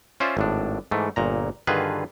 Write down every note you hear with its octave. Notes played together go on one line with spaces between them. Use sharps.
C#4 F4 C5 D5 E5
G#1 A2 D4
G#2 E3 A3
G1 A#2 A#5
G2 D3 D#3 F4 G#4 B4